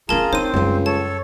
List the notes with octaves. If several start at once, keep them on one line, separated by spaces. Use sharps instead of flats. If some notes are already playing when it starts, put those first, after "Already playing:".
A3 C#4 F4 G#4 A#4 A5 A#5
D#3 C4 E4 C5 C#5 D#7
C#2 F#2 G3
A4 C#5 A5